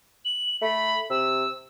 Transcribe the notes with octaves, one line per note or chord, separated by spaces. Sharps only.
F#7
A3 B5
C3 E6